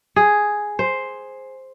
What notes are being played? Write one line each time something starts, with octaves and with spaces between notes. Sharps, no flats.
G#4
C5